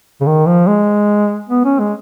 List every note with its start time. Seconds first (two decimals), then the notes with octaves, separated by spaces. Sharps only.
0.21 C#3
0.26 D#3
0.46 F3
0.67 G#3
1.49 B3
1.65 C#4
1.79 G#3